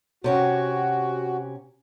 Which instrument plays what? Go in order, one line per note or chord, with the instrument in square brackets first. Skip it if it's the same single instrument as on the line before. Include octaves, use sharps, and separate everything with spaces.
[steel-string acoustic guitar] C3 C#4 G4 [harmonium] F#4